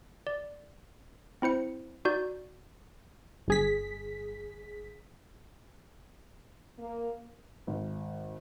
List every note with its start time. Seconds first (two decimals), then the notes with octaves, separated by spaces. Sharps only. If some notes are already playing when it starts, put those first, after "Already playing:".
0.27 D5
1.42 C4 E4 C5 C#7
2.05 D#4 F#4 D5 G6
3.48 G1 G#4 B6
6.79 A#3
7.67 G#1